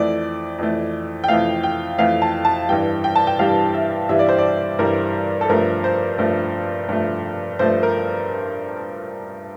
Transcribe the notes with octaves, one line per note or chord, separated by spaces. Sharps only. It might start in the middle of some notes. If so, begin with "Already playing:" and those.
Already playing: F2 E3 A3 D5
F2 E3 A3
G5
F2 E3 A3 F5
G5
F2 E3 A3 F5
A5
A5
G2 E3 G3 G5
G5
A5
G5
G2 E3 G3 F5
E5
G2 E3 G3 E5
D5
C5
D5
G2 E3 G3 A#4
A4
G2 F3 A3 A#4
C5
G2 F3 A3
G2 F3 A3
G2 F3 A3 C5
A#4